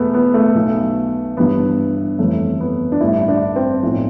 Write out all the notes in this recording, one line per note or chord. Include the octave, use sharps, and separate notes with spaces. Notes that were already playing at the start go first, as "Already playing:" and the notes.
Already playing: E2 B2 A3 B3
B3
A3
B1 B2
G1 G2 E3 B3
G1 F2 E3 A3
B3
D4
A1 G2 D3 E4
D4
C4
B1 A2 F3